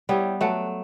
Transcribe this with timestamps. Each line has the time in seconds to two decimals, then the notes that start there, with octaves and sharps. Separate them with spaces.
0.09 G3 B3 E4 G4 C#5
0.41 F#3 A3 B4 F#5 A5